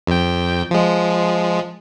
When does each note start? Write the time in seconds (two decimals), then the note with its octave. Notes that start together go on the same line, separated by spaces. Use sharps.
0.07 F2 G5
0.71 F3 G#3